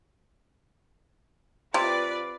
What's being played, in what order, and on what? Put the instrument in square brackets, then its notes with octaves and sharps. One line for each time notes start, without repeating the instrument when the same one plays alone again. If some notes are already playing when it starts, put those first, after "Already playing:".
[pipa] C3 [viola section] F4 B4 D5